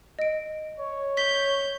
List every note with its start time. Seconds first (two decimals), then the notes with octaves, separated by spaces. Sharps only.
0.19 D#5 D7
0.80 C#5
1.17 G6 B6